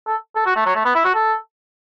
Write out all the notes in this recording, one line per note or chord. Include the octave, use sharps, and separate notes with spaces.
A4
A4
F#4
A3
F#3
A3
B3
E4
F#4
A4